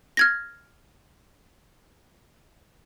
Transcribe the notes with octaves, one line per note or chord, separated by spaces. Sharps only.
F6 G#6 A#6